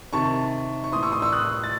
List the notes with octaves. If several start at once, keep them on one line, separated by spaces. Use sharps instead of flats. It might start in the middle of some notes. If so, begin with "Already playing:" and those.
C3 D#3 A5 C#6
C#6
A2 E3 C6 D#6
C#6 E6
C6 D#6
C#6 E6
D#6 F#6
A6